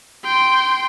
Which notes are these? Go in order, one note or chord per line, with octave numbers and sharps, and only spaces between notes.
G5 C6